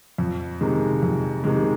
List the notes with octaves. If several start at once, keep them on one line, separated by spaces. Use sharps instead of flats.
F2
C3 D#3 G#3
F2
C3 D#3 G#3